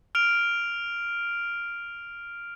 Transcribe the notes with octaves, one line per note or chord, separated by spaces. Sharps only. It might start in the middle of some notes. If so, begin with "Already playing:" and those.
F6 D7 F7